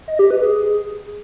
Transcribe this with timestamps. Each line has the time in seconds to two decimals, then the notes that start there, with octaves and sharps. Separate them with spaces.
0.08 D#5
0.19 G4
0.30 B4
0.42 G#4